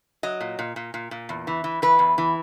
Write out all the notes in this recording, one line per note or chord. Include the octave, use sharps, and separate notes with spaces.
F#3 D#5
A#2
A#2
A#2
A#2
A#2
E2
E3
E3
E3 B4
E2
E3